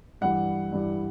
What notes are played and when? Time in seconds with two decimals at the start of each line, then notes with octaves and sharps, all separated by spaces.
0.21 G2 E3 G3 F#5
0.71 G2 E3 G3